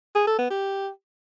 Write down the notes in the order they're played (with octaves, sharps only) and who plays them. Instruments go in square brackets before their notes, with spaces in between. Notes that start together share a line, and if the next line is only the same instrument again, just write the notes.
[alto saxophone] G#4
A4
B3
G4